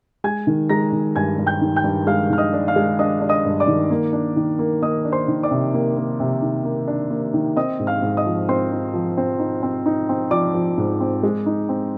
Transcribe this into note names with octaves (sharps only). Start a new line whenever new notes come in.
G#3 G#5 G#6
D#3
G#3 A#5 A#6
D#3
G2 G#5 G#6
G2
G5 G6
D#3
G5 G6
G2
G#3 F5 F6
D#3 F6
D#5 D#6
D4
F5 F6
G#3
D4 D#5 D#6
D4
D#5 D#6
G2
D5 D6
D#3
A#3
D4
D#3
A#3
A#3 D#5 D#6
D4
C5 C6
D#3
D5 D6
C3
A#3
A#3
C3
D#3
A#3
D4
A#3
D#3
C4 D#5 D#6
G#2
F5 F6
G#2
D#5 D#6
F3
C4 C5 C6
D#4
F3
C4
D#4
C4
D#4
C4
F3 D5 D6
F3
G#2
C4
G#3
D#4
C4